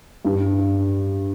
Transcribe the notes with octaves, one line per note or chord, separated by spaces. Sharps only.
G2